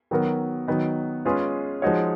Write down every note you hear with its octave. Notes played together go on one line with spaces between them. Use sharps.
D#3 F#3 B3 F#4 A#4
D#3 F#3 B3 D#4
G#3 C#4 F4 G#4 B4
F3 G#3 D#4 F#4 C#5